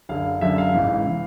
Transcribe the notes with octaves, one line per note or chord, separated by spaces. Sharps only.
F#1 F#2 D3 F5
F#1 F#2 D3 E5
F5
A1 G#2 E3
E3